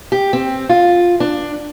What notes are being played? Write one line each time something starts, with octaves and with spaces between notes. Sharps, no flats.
G4
C4
F4
D4